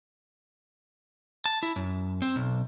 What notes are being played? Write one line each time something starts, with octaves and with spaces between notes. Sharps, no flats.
A5
E4
F#2
C4
B1